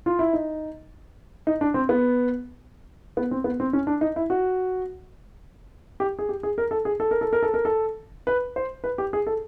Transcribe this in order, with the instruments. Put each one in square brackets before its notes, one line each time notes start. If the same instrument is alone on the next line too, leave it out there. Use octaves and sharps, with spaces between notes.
[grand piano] F4
E4
D#4
D#4
D4
C4
B3
B3
C4
B3
C4
C#4
D4
D#4
E4
F#4
G4
G#4
G4
G#4
A#4
A4
G#4
A4
A#4
A4
A#4
A4
A#4
A4
B4
C5
B4
G4
G#4
A4